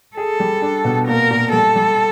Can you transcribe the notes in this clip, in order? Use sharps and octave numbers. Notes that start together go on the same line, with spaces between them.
G#4 A4
G3
D4
B2
A#2 A#4
A#2
G3 A4
G3